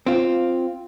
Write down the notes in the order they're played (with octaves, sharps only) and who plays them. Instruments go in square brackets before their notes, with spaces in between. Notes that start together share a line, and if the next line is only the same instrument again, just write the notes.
[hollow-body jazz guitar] C4 F4